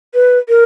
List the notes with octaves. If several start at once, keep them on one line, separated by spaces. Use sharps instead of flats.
B4
A#4